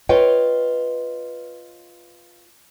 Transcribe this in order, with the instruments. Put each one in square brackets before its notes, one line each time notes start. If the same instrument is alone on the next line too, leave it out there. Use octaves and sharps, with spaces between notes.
[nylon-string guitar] F4 B4 C#5 D#5 G5